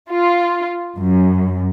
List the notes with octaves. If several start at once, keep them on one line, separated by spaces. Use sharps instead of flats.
F4
F#2